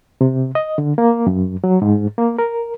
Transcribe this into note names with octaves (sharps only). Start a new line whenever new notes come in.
C3
D#5
D3
A#3
F#2
F#3
G#2
A#3
A#4